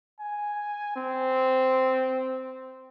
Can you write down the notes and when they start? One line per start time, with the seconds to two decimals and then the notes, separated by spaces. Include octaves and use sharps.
0.20 G#5
0.96 C4